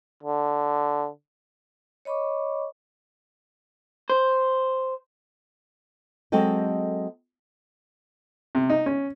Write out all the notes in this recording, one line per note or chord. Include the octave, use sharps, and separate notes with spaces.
D3
C#5 D#5 B5 C#6 D6
C5
F#3 G#3 C4 A4 D#5 G5
C3
D#4
C#4